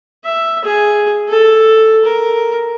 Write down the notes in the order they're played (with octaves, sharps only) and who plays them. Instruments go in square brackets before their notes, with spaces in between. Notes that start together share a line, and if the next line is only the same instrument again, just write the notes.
[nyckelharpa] E5
G#4
A4
A#4